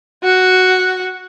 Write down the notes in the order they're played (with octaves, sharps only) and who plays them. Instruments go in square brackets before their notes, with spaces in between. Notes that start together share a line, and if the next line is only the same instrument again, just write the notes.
[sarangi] F#4